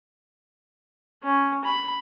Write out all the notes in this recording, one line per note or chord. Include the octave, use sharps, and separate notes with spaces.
C#4
B5